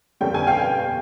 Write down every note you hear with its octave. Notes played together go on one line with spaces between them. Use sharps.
F2 D3 G3 A#3 C#4 G5
G#5
F5 G5